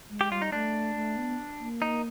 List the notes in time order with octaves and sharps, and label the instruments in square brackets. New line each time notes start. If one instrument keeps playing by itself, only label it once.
[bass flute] G#3
[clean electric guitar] G4
[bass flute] G3 [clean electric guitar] F4
[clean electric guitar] D#4
[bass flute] A3 [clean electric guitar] D4
[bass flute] A3
B3
A#3
[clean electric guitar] D#4